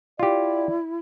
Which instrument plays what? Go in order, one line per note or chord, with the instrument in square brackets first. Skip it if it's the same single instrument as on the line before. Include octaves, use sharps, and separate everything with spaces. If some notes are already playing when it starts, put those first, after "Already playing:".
[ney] E4 [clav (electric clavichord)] F4 G4 [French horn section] D5